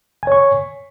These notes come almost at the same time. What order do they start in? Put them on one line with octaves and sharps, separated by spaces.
G#5 C#5 C#6